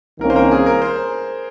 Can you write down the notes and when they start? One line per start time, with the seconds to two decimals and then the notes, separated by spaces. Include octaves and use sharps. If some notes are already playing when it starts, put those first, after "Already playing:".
0.20 C2 C3 D#3 A#3 C#4 A#4
0.30 C5
0.36 A#4
0.51 G#4
0.66 A#4
0.82 C5